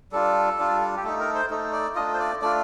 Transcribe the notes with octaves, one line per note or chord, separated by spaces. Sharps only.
G3 D4 F4 A4
G3 D4 F4
G4
A3 D#4 A4
A#4
C5
A3 D#4
D5
A3 D4 F4 D#5
C5
D5
A3 D4 F4 D5